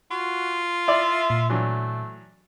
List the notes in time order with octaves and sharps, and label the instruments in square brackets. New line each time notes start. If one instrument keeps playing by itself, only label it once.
[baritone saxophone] F4 [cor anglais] F#4
[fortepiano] E4 D5 [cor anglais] E5
[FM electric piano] A#2
[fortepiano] E3 F#3 D4 [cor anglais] A3